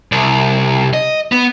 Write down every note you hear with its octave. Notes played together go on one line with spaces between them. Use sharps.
C2
D#5
B3